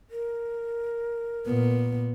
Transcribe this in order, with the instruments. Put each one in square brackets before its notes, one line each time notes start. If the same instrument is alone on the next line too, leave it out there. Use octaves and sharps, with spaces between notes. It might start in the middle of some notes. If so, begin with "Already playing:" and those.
[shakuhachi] A#4
[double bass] A#2 B3